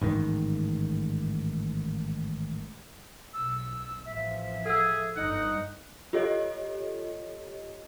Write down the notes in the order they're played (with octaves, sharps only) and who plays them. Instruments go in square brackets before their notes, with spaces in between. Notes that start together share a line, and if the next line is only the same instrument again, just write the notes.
[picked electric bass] A1 G#2 D#3
[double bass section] B1 [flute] E6
[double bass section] A1 F3 [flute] E5
[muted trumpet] G#4 [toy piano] A4 E6
[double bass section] G1 G2 [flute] D#4 [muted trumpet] F#5
[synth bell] F4 G4 A4 C#5 D#5